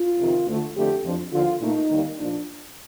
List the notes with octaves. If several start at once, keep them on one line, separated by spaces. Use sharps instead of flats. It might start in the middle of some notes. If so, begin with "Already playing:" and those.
Already playing: F4
F2 C3 D#3
D2 D3 A3
F2 D3 A3 G4
F2 D3 F3
D#2 D3 F3 F4
A#2 A3 D#4
D#2 D#3 G3 A#3
A#2 F3 D4